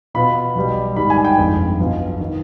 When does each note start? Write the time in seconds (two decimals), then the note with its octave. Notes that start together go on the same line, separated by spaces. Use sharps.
0.14 B2 B3 F4 B5
0.55 B1 B2 G3
0.96 G#2 D#3 G3 B5
1.10 G#5
1.25 G5
1.37 G1 F2 D#3 G#3
1.79 B1 B2 B3 F4
2.20 D#3